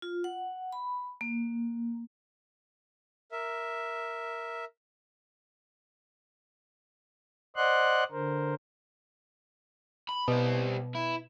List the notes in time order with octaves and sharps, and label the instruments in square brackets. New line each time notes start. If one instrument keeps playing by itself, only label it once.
[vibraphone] F4
F#5
B5
A#3
[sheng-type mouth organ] A#4 E5
[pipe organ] C5 D5 D#5 F#5 C6 F#6
D3 A#4 C5
[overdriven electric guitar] B5
[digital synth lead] B2 [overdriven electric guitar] G3 C5
[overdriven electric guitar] E4